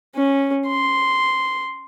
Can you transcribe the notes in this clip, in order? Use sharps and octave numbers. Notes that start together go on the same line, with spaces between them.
C#4
C6